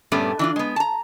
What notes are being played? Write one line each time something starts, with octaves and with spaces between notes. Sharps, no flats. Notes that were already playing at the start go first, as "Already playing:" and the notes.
G2 A#2 G3 A3 B3 C#4
E3 D4 F4
G#3 B3
A5 A#5